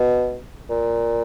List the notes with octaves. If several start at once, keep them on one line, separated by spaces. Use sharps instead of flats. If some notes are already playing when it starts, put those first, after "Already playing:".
Already playing: B2
A#2